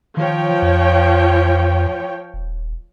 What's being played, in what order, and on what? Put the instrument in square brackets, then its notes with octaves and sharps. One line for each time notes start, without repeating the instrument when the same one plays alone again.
[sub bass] D#3 [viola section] F3 C#5 G5
[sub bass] F2
D#1